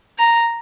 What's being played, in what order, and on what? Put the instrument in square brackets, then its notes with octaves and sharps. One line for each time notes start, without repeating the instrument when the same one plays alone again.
[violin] A#5